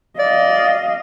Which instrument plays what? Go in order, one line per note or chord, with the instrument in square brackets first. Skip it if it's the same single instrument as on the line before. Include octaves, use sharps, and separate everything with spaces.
[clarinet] D5 [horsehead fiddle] D#5 F5